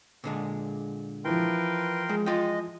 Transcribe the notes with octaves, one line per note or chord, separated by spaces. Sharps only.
A#2 D3 G#3
E3 F3 A#4 B4 G5 C6
G#3
G#3 F4 D#5 G5